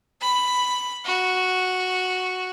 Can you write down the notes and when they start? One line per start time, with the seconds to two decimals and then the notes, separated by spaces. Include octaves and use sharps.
0.22 B5
1.05 F#4